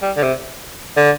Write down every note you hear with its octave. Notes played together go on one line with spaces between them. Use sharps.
G3
D3
C3
D3